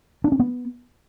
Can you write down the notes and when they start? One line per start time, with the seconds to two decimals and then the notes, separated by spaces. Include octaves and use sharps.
0.24 D4
0.32 C#4
0.39 B3